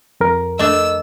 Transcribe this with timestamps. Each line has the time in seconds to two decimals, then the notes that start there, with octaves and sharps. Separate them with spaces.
0.20 F2 A#4
0.59 A3 D4 D#5 E6